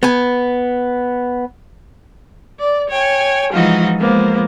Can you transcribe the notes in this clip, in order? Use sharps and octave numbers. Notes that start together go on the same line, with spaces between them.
B3 G#5
D5
C#5 G5 G#5
E3 F3 G#3 D#4 F4 F#4
F3 G#3 A#3 B3 C5